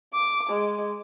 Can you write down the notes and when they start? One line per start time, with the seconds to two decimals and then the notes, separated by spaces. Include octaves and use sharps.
0.15 D6
0.50 G#3